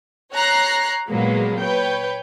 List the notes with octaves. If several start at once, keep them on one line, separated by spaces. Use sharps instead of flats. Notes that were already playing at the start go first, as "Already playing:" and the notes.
C#5 A#5 F#6 A#6 C7
A#2 F#3 G#3 A#3 B3
B4 C#5 G5